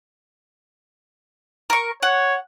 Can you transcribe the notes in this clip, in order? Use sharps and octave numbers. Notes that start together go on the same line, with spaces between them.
A#4 C#6
C#5 F#5